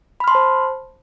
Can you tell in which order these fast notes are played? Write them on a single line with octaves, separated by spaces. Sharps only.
B5 F6 C6 A5 C5